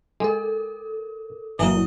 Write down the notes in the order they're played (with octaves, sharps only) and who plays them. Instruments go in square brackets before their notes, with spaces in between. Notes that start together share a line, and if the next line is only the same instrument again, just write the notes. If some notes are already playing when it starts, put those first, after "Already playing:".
[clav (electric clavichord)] G#3 [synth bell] A4 A#4
[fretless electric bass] G1 A#2 F#3 [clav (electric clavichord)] E3 A#3 [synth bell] E4 [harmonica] D#5